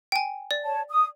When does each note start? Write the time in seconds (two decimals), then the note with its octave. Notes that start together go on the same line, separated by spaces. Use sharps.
0.12 G5 G#5
0.51 D5
0.64 C#5 A5
0.89 D#6